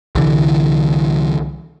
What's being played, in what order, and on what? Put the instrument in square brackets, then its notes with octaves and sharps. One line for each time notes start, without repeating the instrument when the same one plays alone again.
[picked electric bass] C2 D3 E3